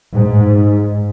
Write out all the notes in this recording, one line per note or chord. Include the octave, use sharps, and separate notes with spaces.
G#2